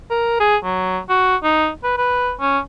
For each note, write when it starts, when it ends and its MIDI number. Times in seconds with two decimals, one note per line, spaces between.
0.11 0.38 70
0.40 0.57 68
0.64 1.00 54
1.09 1.36 66
1.44 1.69 63
1.84 1.94 71
1.97 2.32 71
2.40 2.59 61